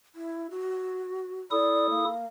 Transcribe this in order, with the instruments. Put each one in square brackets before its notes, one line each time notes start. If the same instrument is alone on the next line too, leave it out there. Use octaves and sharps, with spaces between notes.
[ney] E4
F#4
[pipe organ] E4 A4 D#6 [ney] D5
[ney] A#3